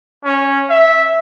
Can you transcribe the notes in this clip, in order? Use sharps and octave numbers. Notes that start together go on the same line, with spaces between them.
C#4
E5